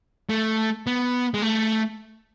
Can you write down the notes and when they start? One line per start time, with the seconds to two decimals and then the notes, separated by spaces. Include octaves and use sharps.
0.30 A3
0.87 B3
1.34 G#3
1.42 A3